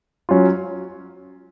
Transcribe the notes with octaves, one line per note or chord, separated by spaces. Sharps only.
F#3 C#4 F4